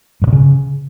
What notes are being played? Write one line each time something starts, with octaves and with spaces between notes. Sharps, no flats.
G2
C3
C#3